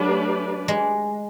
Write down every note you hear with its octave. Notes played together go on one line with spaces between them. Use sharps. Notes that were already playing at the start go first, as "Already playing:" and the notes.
Already playing: F#3 A3 D4 G4 B4 D5
G#3